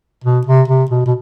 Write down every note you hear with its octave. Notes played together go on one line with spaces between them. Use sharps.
B2
C3
C3
B2
B2